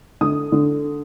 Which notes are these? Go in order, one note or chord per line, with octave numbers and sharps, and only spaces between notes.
D3 D#6
D3